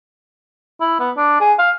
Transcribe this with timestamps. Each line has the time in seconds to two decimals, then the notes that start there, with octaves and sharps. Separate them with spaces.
0.81 E4
1.00 B3
1.17 D4
1.40 G#4
1.59 F5